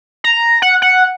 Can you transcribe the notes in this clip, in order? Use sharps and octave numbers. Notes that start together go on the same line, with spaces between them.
A#5
F#5
F#5